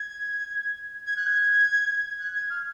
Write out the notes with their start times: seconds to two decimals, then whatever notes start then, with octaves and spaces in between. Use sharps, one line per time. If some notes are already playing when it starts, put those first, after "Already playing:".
Already playing: G#6
1.06 G#6
1.17 F#6
1.27 G#6
2.20 F#6
2.35 G#6
2.50 F6